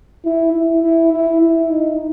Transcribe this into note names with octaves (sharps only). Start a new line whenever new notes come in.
E4
E4
E4
E4
E4
D#4